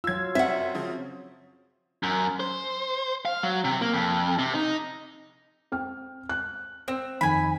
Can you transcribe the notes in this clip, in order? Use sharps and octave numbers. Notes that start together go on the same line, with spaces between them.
F#3 F4 E6 G#6
F#2 C4 E5 F#5
C#3 F3
F#2
C5
F5
F#3
C3
A#3
F2
C3
D#4
C4 G5 F6
F#6
C4 C5
F2 D#3 G#5 B5